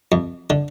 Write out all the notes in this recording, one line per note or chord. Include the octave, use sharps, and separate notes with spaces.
F2
D3